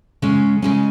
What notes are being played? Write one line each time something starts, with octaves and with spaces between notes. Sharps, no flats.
C#3 G#3 C#4
C#3 G#3 C#4